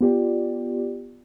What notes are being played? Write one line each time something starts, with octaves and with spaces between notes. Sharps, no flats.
B3 F4 G4 D5